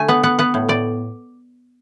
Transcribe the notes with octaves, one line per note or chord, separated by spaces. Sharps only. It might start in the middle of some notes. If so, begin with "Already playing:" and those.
Already playing: D3 A3 G#5
B3 F#5
B3 F#5
B3 F#5
A2
A2 D5